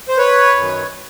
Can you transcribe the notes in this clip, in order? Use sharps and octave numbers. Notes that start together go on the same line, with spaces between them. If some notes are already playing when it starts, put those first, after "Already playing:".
C5
B4 C#5
F#2 D#3